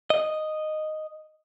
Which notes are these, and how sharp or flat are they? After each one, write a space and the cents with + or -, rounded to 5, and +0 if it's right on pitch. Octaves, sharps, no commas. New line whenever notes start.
D#5 -5